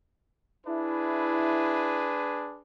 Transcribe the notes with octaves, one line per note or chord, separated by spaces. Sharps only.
D4 E4 G#4 B4